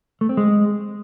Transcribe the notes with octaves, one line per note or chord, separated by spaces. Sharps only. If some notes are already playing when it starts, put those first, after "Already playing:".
A3
C4
G#3